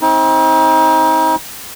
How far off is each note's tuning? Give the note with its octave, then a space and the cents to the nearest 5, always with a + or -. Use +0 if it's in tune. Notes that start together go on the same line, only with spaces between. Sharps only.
C4 +20 D#4 +35